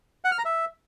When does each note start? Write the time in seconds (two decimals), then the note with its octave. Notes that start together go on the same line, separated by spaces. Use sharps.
0.24 F#5
0.31 F6
0.38 A#5
0.45 E5